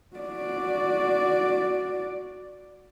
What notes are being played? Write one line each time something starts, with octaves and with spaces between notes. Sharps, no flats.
F#4 D5